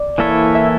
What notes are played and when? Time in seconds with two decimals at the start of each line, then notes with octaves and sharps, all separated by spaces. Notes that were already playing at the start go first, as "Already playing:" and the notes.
Already playing: D5
0.18 E3 A#3 E4 A4 C#5
0.55 E5